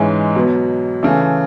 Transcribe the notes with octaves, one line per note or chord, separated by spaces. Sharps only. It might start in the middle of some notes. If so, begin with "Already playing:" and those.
Already playing: G#2 E3 G#3 C#4 E4
B2 F#3 B3
C#3 E3 A3